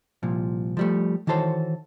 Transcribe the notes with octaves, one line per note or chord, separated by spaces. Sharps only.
C2 A#2 F3
F3 G3 A3
D#3 E3 F#4 A4 C5 C#5